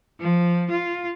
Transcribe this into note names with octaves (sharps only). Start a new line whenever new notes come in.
F3
F4